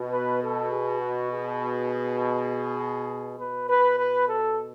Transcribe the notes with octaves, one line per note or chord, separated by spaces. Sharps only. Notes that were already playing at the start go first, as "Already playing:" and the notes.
Already playing: B2
B4
A4
G#4
F#4
G#4
B2 B4
B4
B4
A4